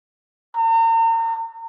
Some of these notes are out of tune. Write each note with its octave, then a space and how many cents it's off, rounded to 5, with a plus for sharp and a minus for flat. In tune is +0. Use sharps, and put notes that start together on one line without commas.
A#5 -40